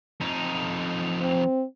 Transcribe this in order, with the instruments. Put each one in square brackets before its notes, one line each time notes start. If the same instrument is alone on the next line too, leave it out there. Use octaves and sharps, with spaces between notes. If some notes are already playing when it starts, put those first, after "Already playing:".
[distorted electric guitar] F2 D#4
[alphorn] C4